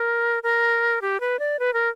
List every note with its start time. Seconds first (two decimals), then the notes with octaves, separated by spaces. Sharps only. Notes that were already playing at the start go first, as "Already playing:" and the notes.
Already playing: A#4
0.43 A#4
1.02 G4
1.20 B4
1.39 D5
1.59 B4
1.73 A#4